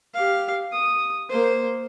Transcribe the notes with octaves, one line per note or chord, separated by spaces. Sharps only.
G4 F5
D#6
A#3 C5